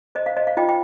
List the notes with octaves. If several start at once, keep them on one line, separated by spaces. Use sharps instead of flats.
C5 D#5
F5
C5 D#5
F5
F4 D#5 G5
G5